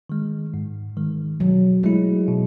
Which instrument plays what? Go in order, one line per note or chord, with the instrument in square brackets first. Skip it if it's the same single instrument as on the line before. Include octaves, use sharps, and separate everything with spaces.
[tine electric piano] D#3 G#3
G#2
D#3 G#3
[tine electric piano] B2 [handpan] F#3
[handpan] G#3 [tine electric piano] A3 E4
[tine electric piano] B2